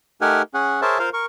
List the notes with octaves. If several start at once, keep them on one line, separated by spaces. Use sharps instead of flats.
A3 D#4 G4 A#4 F#5 G#5
C#4 G#4 F#5
G#4 A#4 C5 C#5 E5 A5
F4 A#4 C5 F5
A#4 C#6